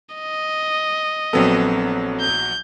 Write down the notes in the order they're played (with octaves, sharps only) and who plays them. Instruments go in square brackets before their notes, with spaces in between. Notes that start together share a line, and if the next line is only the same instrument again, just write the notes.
[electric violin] D#5
[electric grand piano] A#1 F#3 B3 [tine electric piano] C4 A4
[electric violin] G6